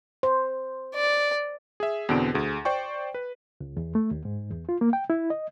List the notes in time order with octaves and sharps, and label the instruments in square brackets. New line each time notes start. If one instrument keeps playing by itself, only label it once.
[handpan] C5
[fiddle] D5
[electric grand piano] G#4 E5
E2 B2 D3 C4 D7
D2 G#4
C5 D5 G5 C#6
B4
[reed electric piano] C#2
E2
A3
D#2
G#2
E2
F4
A#3
G5
E4
D#5